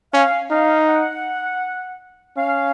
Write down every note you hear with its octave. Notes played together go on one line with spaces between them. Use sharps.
C#4 F5
D#4 F5
F#5
C#4 F5